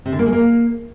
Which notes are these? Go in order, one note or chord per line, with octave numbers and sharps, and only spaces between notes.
C3
D3
A#3
G#3
A#3